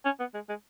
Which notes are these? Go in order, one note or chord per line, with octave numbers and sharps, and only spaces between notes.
C#4
B3
G#3
G#3